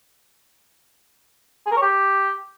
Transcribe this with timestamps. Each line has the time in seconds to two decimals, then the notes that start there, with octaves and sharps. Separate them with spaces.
1.66 G#4
1.71 A#4
1.76 C#5
1.81 G4